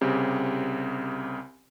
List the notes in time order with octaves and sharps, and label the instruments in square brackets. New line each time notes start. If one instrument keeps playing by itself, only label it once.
[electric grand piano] C2 C#3 C4 G4